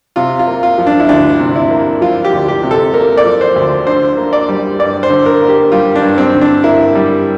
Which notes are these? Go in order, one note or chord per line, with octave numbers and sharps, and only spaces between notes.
C3 F4
F4
A#3
F4
F3
D4
E4
D2 D4
C3
E4
A#3
F3 F4
G4
D2
G4
C3
A4
A#3 A#4
D5
F3
C5
D2
D3 C5
A#3
D5
G3
G2 D5
C5
D3
A#4
A#3
G4
G3 F4
D4
G2
C4
D3
D4
A#3 E4
G3